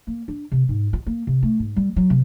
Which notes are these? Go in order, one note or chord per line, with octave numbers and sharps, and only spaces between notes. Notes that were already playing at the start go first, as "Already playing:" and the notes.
A#3
D4
C3
G#2
F4
A#3
C3
A3
G#2
G3
F#3
C3